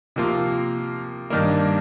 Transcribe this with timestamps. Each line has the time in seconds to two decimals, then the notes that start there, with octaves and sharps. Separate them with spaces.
0.16 C3 F3 A#3 F4
1.30 G2 D#3 G3 A#3